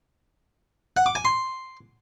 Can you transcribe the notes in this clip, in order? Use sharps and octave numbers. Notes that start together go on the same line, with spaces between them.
F#5
D6
G#5
C6